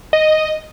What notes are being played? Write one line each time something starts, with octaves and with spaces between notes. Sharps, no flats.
D#5